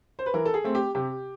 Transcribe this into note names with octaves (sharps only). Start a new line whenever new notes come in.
C5
B4
E3 A#4
A4
G#4
A3 C4
G4
C3 G4